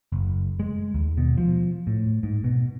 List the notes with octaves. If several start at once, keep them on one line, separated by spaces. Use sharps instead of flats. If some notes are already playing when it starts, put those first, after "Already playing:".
F#1
G#3
D#2
B2
F3
A2
G#2
B2